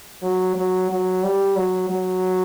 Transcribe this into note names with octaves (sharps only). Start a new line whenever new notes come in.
F#3
F#3
F#3
G3
F#3
F#3